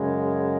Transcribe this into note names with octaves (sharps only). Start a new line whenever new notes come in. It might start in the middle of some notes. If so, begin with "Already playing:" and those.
Already playing: F#2 C#3 G#3